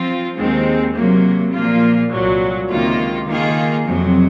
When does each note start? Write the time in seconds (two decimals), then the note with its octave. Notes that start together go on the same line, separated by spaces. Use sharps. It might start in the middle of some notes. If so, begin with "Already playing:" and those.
Already playing: F3 C4 F4
0.37 D#2 D#3 G#3 C4
0.95 C3 F#3 A#3
1.53 A#2 F3 A#3 F4
2.11 C2 A#2 F#3
2.69 C#2 C3 D#3 A#3 F4
3.28 D#3 A#3 F4 G#4
3.86 F2 C3 F#3